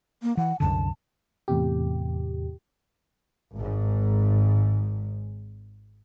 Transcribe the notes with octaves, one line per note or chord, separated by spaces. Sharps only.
A#3
E3 F#5
C2 F#2 D3 A5
E2 A2 C3 G4
G#1 G#2